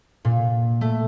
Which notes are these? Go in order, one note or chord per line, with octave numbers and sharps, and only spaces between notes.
A#2
A3